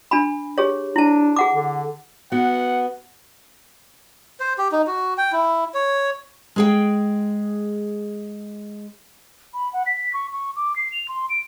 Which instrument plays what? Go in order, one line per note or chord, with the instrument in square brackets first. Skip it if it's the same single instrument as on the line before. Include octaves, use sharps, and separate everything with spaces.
[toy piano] D4 G#5 B5
G4 G#4 C#5
[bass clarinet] D4 [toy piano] E4 A5
[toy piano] G#4 F#5 D6
[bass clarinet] D3
[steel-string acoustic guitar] B3 F#4 [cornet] F#5
[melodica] C5
G4
D#4
F#4
G5
E4
C#5
[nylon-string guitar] G#3 G#4 G5
[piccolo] B5
F#5
B6
C#6
C#6
D6
C7
F7
C6
D7